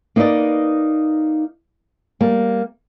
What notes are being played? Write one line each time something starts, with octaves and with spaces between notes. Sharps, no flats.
A#3 D#4 B4 C5 D5 D#5
G3 A#3